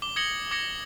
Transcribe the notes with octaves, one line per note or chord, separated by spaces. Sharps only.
D6 G7
D#6 G#6 A#6 C#7 F#7 G7
D6 G#6 A#6 C#7